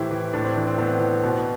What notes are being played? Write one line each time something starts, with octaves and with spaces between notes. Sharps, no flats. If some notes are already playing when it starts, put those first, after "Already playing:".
Already playing: A2 E3 E4 G4 C5
E3
A2 D4
C4
E3 D4
C4
A2 B3
E3
B2